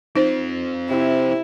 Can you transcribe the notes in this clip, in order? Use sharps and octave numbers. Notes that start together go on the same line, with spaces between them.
C4 D#4 F4 C5
C3 E4